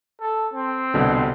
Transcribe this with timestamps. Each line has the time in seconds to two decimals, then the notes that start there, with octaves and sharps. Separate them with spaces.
0.21 A4
0.54 C4
0.94 C2 B2 D3